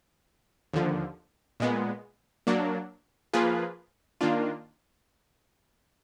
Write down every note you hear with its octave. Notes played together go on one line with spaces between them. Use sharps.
D#2 D3 F3
A#2 G#3 B3
F#3 A#3 D4
F3 A#3 F4 G#4 B4
D#3 A#3 D4 F4